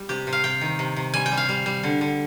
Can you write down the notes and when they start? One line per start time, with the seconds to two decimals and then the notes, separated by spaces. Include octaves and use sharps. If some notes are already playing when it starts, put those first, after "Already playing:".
Already playing: G3
0.09 C3 G4
0.27 C3
0.33 F5
0.44 C3 G5
0.61 D#3
0.79 C3
0.96 C3
1.14 G3 G#5
1.26 G5
1.32 G3
1.37 F5
1.49 G3
1.66 G3
1.83 D3
2.01 D3